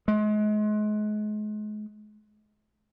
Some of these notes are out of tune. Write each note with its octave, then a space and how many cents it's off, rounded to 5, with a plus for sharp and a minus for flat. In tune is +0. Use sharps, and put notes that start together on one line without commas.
G#3 +35